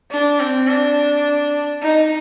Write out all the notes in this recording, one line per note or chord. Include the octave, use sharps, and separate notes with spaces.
D4
C4
D4
D#4